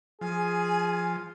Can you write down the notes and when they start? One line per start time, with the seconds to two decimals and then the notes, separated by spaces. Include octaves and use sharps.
0.21 F3 G#4 G#5